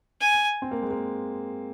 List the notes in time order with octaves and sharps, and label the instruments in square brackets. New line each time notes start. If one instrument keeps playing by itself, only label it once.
[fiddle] G#5
[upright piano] C4
A#3
G#3
A#3